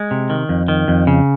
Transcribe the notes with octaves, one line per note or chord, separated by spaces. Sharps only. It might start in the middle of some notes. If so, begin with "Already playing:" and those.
Already playing: G#3
C3
D#3
F2
D#3
F2
C#3